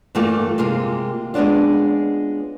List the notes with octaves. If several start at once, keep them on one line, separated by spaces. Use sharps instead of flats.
G2 E3 A3 A#3 F4
C3 G#3 A#3 F4
G#3 B3 C#4 D4 F4